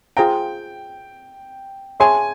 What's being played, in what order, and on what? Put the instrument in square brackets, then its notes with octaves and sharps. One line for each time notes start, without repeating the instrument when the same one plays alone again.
[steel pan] F4 G#4 C5 F5 A#5 [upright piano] G5
[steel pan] G#4 C#5 E5 A5 C6 [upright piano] G#5